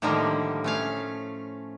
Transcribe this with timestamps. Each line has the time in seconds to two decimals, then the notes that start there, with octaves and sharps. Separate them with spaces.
0.02 A2 D3 D#3 F3 G3 A#3
0.64 A3 C#4 F5